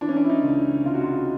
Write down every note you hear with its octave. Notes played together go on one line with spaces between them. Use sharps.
E3 D4
C#4
D4
E4
D#4
C#2
E4
C3 F4
F#4
F4